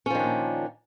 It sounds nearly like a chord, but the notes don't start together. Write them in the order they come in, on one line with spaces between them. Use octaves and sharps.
C#4 F3 D#3 D4 A#2